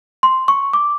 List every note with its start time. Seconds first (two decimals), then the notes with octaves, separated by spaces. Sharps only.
0.23 C6
0.48 C#6
0.73 D6